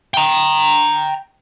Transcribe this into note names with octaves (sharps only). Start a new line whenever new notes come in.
G5 A#5